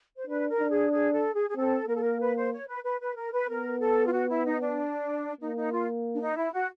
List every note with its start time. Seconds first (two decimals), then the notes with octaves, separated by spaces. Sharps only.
0.16 C5
0.27 D4 B4
0.49 A#4
0.60 D4
0.70 G#4
0.92 G#4
1.13 A4
1.34 G#4
1.50 G#4
1.56 C4 A4
1.88 A#3 A#4
1.96 A4
2.02 A#4
2.20 B4
2.36 C5
2.52 C#5
2.68 B4
2.84 B4
3.00 B4
3.16 A#4
3.33 B4
3.49 B3 A#4
3.80 A4
4.07 F4
4.13 F#4
4.29 E4
4.45 D#4
4.61 D4
5.41 A#3 D#4
5.57 D#4
5.73 F4
6.14 D4
6.22 D#4
6.37 E4
6.53 F#4